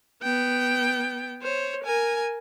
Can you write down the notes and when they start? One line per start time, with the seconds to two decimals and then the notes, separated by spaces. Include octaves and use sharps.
0.22 B3 G5
1.42 C5 C#5
1.83 A#4 G#5